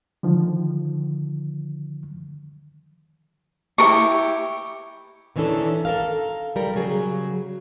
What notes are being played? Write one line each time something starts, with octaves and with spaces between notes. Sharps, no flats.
D3 D#3 F3
E4 G4 A#4 C#6
D#3 E3 C#4 D4 A4
A4 A#4 F5
G3 A#4
C#3 F#3 G#4